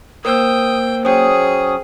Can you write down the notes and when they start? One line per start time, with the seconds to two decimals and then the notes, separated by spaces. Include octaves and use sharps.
0.25 A#3 A#4 C5 G5 D#6 E6
1.05 F#3 C#4 G#4 C5 G5 D#6